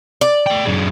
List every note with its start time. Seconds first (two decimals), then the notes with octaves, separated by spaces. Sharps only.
0.21 D5
0.47 A3 G5
0.65 F#2 G#3